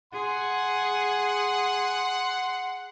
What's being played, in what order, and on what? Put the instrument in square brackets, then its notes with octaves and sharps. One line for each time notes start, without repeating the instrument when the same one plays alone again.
[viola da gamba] G#4 [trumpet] F#5 [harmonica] C6